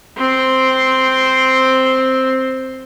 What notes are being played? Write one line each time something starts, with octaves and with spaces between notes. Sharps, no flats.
C4 C6